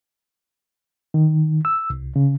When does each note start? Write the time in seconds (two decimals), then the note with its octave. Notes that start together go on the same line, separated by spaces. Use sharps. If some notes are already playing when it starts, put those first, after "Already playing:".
1.14 D#3
1.65 E6
1.90 C2
2.16 C#3